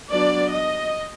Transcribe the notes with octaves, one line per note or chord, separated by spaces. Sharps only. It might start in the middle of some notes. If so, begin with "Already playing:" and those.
F#3 B3 D4 D5
D#5